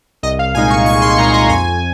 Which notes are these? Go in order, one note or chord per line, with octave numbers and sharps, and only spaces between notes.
C2 D#5
F5
A#2 G#3 D#4 G#5
C#6
C2 C#6
C6
A#2 G#3 D#4 A#5
G#5
F2 G#5